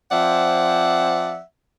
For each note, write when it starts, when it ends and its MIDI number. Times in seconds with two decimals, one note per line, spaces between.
0.12 1.40 53
0.12 1.40 60
0.12 1.40 74
0.12 1.40 76
0.12 1.40 78